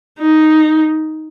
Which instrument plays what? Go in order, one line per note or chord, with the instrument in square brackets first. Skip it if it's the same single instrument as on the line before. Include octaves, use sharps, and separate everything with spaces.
[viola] D#4